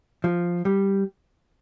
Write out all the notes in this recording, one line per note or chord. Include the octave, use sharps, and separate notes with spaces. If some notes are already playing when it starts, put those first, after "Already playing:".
F3
G3